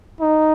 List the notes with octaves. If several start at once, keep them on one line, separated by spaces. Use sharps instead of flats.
D#4